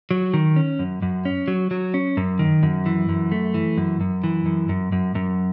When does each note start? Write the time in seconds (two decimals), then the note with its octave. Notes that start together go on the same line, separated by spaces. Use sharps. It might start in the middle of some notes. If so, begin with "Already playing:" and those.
0.11 F#3
0.34 D#3
0.56 C#4
0.79 F#2
1.02 F#2
1.25 C#4
1.48 F#3
1.71 F#3
1.94 C#4
2.17 F#2
2.39 D#3
2.63 F#2
2.86 E3
3.09 F#2
3.32 A3
3.54 E3
3.77 F#2
4.01 F#2
4.24 E3
4.46 F#2
4.69 F#2
4.92 F#2
5.15 F#2